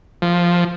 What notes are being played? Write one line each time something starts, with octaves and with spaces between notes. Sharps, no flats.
F3